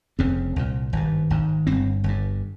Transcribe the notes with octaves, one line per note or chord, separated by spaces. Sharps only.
F1 F2 C#3 C4
C2 A#2
G#1 G2
G#1 G#2
G1 G2 C4
G1 G2